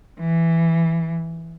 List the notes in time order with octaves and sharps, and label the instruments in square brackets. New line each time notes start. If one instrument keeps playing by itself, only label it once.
[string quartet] E3